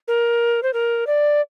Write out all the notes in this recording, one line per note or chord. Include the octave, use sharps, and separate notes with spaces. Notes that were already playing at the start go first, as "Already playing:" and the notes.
A#4
C5
A#4
D5